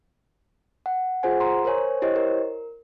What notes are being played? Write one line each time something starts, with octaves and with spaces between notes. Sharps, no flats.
F#5
F4 G#4 C5 F#5 G#5
A#5 C6
A#4 C5 C#5 G#5
E4 G4 C5 C#5 D#5
A#4